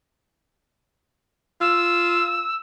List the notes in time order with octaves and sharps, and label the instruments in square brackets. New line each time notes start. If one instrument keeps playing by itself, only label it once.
[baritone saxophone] F4 [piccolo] E6